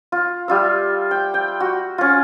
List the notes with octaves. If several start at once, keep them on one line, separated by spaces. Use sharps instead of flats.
F4
G3 F4 E5
G5
G5
F#4
C#4 F4